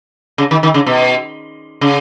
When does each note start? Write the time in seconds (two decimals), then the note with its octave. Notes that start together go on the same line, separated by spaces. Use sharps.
0.38 C#3
0.51 D#3
0.63 D#3
0.74 C#3
0.86 B2
1.81 C#3